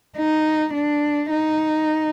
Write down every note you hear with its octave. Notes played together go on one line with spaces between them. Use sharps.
D#4
D4
D#4